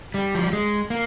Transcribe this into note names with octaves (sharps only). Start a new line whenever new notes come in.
G3
F3
G3
G#3
A#3